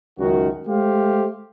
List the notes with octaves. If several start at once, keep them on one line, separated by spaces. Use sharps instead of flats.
C#2 F#2 D#3 F#4
G#3 A3 G4 C5 F5